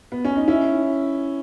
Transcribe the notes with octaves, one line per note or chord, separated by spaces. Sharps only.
B3
C#4
D#4
C#4 E4